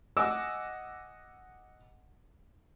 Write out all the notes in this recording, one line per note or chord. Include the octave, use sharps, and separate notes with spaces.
D#5 F#5 G#5 D6 E6